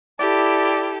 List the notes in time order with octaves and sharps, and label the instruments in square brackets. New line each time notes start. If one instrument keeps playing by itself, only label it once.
[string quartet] E4 G4 A4 [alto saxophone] D5